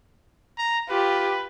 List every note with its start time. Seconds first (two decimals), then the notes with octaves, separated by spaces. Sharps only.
0.58 A#5
0.89 F4 G4 B4